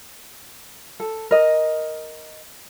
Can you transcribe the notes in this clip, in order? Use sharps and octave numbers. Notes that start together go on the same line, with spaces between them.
A4
A#4 D#5